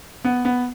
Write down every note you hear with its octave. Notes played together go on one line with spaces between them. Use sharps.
B3
B3